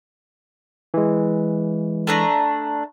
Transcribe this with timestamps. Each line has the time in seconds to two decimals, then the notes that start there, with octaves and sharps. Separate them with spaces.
0.94 E3 G#3
2.07 A3 D4 A#5